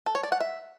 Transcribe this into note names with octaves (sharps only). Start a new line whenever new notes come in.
A4
C#5
D5
F#5
E5